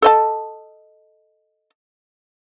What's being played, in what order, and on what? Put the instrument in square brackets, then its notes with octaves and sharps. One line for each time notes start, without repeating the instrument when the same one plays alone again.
[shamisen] A4 D#5 A5